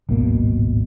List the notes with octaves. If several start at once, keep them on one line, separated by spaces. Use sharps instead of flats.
D1 G#1 B2 A#3